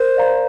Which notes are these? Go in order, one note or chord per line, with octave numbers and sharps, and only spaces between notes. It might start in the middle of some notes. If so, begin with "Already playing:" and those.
Already playing: A#4 C5
D5 F5 A#5